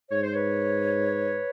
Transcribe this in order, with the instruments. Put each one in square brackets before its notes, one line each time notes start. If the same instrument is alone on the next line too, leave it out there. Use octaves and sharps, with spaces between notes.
[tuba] G#2 [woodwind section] C#5
[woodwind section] C5
B4 C#5